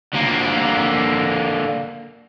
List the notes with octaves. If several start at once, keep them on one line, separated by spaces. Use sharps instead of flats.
D3 A#3